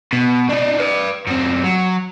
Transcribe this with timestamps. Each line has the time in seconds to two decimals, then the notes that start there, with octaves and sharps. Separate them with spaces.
0.13 B2
0.49 D4 D#4
0.80 B4 D5
1.27 F#2 C4
1.64 F#3